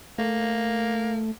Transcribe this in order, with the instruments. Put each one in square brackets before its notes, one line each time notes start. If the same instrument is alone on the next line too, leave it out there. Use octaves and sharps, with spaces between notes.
[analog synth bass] A3 [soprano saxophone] A#3